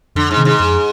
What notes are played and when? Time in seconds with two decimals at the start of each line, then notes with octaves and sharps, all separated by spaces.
0.15 F2 D3
0.31 G#2
0.37 C3 D#3
0.45 G#2
0.60 F2